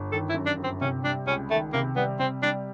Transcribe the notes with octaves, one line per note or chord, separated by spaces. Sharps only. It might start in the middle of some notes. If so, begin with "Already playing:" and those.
Already playing: G1
D#3 A4
E4
F#2
D4
G1
C4
C3 C#4
G3 D4
C#2 C#4
D#3 A3
C3 A#3
G3 B3
C3 C4
G3 D4